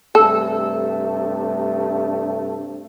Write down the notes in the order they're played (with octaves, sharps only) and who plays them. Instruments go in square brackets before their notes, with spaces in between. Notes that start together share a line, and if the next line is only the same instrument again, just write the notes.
[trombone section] G2 C3 A3 [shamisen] A4